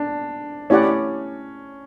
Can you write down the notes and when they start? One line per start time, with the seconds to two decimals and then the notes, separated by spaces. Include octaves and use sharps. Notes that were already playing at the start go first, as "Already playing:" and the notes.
Already playing: D4
0.70 A3 C#4 E4 G4 D5 F#5